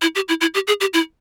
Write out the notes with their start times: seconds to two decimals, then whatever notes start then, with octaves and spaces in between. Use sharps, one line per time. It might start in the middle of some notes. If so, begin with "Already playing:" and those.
0.02 E4
0.15 G4
0.29 E4
0.41 E4
0.54 G4
0.68 G#4
0.81 G4
0.94 E4